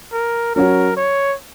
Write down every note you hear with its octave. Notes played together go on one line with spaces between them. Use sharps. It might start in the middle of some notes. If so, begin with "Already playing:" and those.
A#4
F#3 C#4 F#4 A#4
C#5